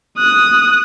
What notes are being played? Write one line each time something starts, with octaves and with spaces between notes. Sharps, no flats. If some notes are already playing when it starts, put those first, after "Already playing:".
D#6 F#6